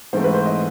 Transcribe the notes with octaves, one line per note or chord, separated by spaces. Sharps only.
G#2 E3 A3 C4 C5
B4
C5
D#5